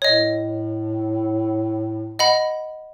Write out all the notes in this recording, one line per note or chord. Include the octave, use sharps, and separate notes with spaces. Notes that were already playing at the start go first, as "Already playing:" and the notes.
A2 C#5 D#5
D#5 F#5 B5